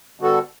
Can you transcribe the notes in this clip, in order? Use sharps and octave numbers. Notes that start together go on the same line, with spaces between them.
D3 G3 B3 F#4 A4